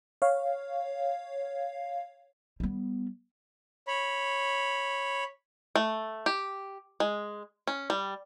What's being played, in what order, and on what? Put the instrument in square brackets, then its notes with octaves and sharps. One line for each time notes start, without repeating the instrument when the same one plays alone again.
[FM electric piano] C#5 F5
[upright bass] G3 B3
[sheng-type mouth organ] C#5 B5
[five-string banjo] A3
G4
G#3
C#4
G3